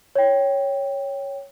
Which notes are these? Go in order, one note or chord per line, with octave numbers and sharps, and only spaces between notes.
C#5 G5